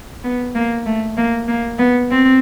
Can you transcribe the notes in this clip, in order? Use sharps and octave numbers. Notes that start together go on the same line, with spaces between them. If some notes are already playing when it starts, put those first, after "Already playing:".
B3
A#3
A3
A#3
A#3
B3
C4